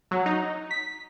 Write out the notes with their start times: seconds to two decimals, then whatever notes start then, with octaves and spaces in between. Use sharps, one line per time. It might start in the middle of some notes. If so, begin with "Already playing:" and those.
0.11 F#3
0.26 D#4
0.71 B6